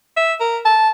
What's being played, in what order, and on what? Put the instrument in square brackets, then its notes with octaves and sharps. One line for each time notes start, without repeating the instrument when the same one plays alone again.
[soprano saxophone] E5
A#4
A5